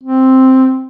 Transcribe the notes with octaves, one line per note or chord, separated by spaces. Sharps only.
C4